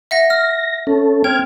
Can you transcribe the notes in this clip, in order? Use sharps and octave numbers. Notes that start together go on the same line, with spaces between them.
E5 F#5 A#6
F6 A#6
C#4 A4
C4 G5 F6 G#6